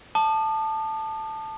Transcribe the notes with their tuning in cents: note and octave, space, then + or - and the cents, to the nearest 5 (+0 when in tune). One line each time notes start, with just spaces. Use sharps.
A5 +0 D#6 -45